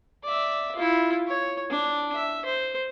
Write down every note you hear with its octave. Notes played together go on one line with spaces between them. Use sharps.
D5 E5
E4 F4
C#5
D4
E5
C5